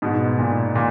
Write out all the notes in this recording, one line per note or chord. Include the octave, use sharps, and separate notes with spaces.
G#2 B2
A#2
A#2